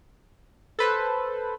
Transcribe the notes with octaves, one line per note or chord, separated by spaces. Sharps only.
A4 B4 C5